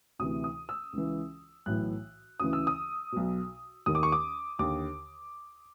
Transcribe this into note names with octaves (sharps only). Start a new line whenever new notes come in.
D2 C3 E3 D#6
D#6
E6
C#2 C#3 E3
B1 A2 E3 F#6
D2 C#3 E3 D#6
E6
D#6
B1 B2
D#2 D#3 D#6
D6
C#6
D6
D#2 D3 D6